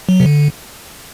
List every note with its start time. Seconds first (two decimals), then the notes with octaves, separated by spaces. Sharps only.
0.09 F#3
0.20 C3
0.26 D3